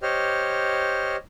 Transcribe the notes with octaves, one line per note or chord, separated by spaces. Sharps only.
G4 C5 C#5 D#5 F6